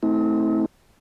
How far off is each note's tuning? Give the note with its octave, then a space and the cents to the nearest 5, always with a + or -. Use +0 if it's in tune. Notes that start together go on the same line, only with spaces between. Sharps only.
A3 +0 C4 +0 E4 -45